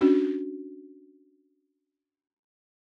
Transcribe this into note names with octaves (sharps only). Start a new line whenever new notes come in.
C#4 D4 F#4